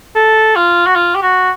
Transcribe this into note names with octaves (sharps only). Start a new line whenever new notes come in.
A4
F4
F#4
F4
G4
F#4